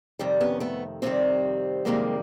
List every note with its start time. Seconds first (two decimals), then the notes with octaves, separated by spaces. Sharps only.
0.19 F2 C3 D#3 G3
0.41 B3 C#4
0.60 A3 B3
1.02 F2 C3 D#3 G3 A#3 C4
1.85 F2 C3 D#3 G3 G#3 A#3